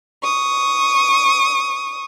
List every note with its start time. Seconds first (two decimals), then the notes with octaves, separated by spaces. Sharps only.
0.23 C#6 D#6